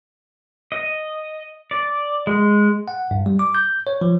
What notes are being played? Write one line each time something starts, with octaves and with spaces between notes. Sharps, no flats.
D#5
D5
G#3
F#5
G2
G3
D6
G6
C#5
F3